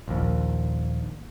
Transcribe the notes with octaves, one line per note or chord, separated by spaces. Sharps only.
A#1 D#2